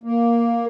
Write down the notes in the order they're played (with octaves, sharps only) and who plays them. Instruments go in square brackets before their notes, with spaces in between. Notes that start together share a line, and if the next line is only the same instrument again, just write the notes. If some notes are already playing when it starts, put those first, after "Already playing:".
[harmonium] A#3